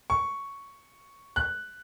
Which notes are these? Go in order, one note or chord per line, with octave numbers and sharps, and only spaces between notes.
C#6
F#6